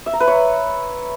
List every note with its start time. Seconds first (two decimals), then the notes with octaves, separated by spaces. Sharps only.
0.06 E5
0.13 A#5
0.20 B4
0.27 C#5